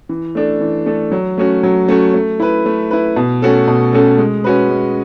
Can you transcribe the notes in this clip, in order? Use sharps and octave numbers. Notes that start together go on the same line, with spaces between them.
E3
A3 D4 A4
E3
A3 D4 A4
F#3
A3 C#4 F#4
F#3
A3 C#4 F#4
A3
E4 B4
A3
E4 B4
B2
A3 C#4 F#4 A4
B2
A3 C#4 F#4 A4
G#3
C#4 F#4 B4
G#3